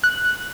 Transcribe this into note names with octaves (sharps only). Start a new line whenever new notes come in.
F#6